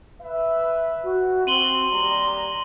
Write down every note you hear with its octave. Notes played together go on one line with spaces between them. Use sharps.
B4 E5
F#4
C4 C6 D#7 F#7 G7
D#2 G3 A#5